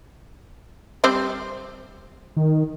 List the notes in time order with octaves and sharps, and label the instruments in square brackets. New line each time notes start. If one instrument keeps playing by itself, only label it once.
[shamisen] G3 C4 C5
[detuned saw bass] D#3